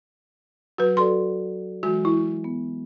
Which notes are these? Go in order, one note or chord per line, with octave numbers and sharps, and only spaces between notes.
F#3 F#4 B4
F#4 A4 D5 C6
E3 G#3 F#4
E4
B3